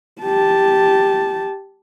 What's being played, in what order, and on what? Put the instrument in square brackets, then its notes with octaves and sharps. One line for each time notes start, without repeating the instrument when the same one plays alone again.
[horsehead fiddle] G4 A5